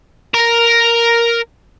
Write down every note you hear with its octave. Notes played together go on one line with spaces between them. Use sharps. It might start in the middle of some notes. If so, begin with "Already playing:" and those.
A#4 A#5